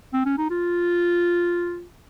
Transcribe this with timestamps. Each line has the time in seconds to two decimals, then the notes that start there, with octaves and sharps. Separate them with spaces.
0.13 C4
0.26 C#4
0.38 D#4
0.50 F4